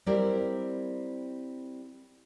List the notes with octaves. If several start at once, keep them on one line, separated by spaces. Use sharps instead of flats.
G3 C4 E4 A#4 D5